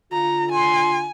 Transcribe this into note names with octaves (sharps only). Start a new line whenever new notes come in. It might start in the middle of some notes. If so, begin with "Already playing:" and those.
D3 F4 A#5
G#5 C6